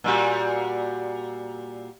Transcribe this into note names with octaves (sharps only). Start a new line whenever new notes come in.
A#2 G3 F#4